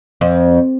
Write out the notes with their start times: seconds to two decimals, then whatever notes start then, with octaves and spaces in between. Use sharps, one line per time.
0.21 F2